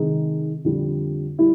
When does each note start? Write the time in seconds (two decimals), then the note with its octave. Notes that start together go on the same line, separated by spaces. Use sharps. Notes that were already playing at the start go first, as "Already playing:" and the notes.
Already playing: C3 D#3 G#3 D#4
0.65 F2 D3 G3
1.39 G3 E4